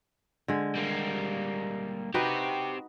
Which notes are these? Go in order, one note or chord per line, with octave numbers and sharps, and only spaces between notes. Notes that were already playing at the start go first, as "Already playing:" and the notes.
D3 G#3
G3 A#3
C4 D#4 F#4 G4 B4